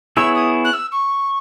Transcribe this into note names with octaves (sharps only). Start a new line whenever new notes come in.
B3 E4 G#4 C#5 E6
D#6
F#6
E6
C#6